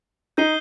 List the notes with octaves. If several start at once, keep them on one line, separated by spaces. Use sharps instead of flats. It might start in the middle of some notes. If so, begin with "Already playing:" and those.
D#4 G6 C7 D#7 G7